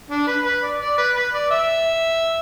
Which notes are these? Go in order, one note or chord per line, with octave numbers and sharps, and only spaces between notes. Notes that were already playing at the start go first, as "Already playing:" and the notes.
D4
B4
B4
D5
D5
B4
B4
D5
E5